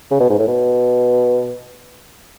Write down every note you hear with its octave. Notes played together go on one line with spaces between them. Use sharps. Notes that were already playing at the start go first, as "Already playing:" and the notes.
C#3
B2
G#2
A2
B2